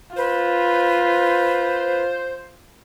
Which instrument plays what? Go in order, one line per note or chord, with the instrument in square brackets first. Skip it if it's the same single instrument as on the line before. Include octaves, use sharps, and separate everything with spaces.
[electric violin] F4 [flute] B4 [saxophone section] C5